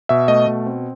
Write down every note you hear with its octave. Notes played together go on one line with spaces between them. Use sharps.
B2 E5
A3 D#5
B2
C4